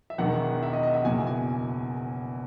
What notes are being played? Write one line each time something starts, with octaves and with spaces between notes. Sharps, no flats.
E5
E1 E2 D#3 F#5
E5
D#5
D#5
E5
F#1 E2 B2 G#5
G#5